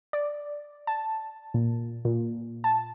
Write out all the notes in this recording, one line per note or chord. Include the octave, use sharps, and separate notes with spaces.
D5
A5
A#2
A#2
A5